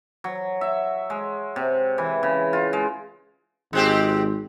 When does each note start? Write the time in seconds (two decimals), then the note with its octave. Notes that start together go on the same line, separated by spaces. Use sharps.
0.24 F#3
0.61 E5
1.10 G#3
1.56 C3
1.98 E3
2.23 C#3
2.53 F4
2.73 G#3
3.73 G#1 G#3 C4 G4